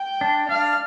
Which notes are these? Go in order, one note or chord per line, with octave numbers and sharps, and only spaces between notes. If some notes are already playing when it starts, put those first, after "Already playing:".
Already playing: G5
D4
D4 F5